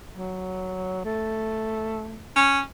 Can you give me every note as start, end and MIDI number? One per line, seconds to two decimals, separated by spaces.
0.17 1.04 54
1.05 2.28 57
2.36 2.61 61